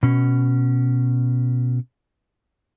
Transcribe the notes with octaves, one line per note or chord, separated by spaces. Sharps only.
B2 C#4